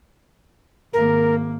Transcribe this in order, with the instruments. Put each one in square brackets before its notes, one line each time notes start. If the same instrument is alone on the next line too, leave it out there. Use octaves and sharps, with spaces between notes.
[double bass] G#1 A#3 [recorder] A#4